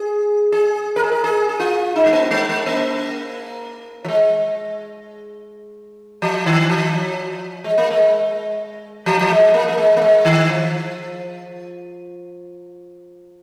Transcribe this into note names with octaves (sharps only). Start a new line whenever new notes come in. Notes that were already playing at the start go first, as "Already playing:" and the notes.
Already playing: G#4
G#4
A#4
G#4
A#4
G#4
G#4
F4
D#4
G#3
A#3
G#3
G#3
A#3
F3
G#3
F3
D#3
F3
G#3
A#3
G#3
F3
F3
G#3
A#3
A#3
G#3
A#3
G#3
D#3
F3